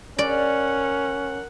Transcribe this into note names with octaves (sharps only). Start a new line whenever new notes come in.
C#4 A#4 D5 F#5